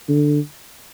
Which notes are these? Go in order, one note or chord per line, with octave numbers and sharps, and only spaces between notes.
D3